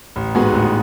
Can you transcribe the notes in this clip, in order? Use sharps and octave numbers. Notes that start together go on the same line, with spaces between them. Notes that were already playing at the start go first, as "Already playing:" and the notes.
A1
G#2 G#3 B3 F#4
A1